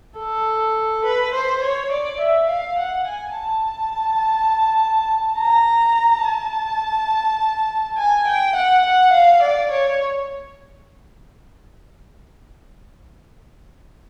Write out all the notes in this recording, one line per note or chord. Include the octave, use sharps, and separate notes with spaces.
A4
B4
C5
C#5
D5
E5
F5
F#5
G#5
A5
A#5
A5
G#5
G5
F#5
F#5
F5
D5
C#5